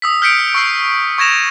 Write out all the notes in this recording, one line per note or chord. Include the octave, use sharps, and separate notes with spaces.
D#6 E6 B6
F6 G6 B6 C#7 D7
C#6 E6 F6 C7 D7
C#6 G#6 A#6 E7 F7